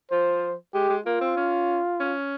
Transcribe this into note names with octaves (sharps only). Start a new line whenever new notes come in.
F3 C5
G#3 G4
G#3
A#3 F4
C4
C#4
C#4